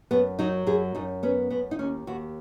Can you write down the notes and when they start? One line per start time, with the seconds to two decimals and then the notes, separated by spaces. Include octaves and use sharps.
0.11 F#2 B3
0.39 F#3 D#4
0.66 F#2 G#4
0.95 F#2 D#4
1.23 B3 C#4
1.50 F#2 B3
1.71 D#4
1.79 D#2 C#4
2.07 D#2 F#4